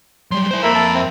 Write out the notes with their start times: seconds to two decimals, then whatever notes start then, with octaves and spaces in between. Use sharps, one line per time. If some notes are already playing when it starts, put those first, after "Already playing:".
0.31 F#3 G3 C6
0.51 E4 C5
0.63 F2 A#3 A4 A#4 E5 B5
0.75 A5
0.95 C4